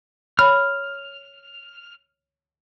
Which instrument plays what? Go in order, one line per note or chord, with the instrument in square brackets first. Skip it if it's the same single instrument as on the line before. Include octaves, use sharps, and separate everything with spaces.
[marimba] C#5 B5 [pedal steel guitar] F6